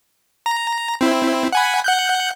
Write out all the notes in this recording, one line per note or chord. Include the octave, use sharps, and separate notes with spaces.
A#5
C4 E4
F#5 G#5 B5
F#5 F#6 G6